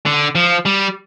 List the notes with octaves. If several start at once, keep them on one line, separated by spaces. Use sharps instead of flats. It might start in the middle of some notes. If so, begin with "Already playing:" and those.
D3
F3
G3